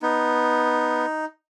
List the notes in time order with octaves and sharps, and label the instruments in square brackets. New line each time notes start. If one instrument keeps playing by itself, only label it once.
[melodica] B3 [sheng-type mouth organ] D#4